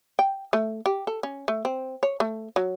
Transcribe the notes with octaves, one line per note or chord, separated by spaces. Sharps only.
G5
A3
G4
A4
C#4
A3
C4
C#5
A3
F#3